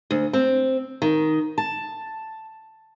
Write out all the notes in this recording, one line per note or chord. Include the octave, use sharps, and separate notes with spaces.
D2
C4
D#3
A5